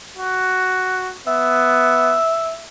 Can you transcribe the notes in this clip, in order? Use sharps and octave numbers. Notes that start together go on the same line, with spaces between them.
F#4
B3 E5